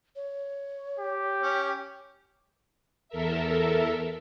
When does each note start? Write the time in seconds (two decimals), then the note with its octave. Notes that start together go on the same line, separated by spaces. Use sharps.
0.16 C#5
0.99 G4
1.43 C#4
3.09 E2 A4 A#4 E5